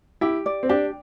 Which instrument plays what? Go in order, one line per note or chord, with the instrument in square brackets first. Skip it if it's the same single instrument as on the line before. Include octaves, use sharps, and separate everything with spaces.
[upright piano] E4 [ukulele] G4
[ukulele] D5
[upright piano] C4
[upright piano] D4 [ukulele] G4